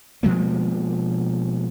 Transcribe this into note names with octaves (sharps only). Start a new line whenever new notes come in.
B2 F3 G#3 A#3